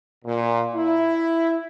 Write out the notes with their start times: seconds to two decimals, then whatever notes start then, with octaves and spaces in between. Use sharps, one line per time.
0.25 A#2
0.75 E4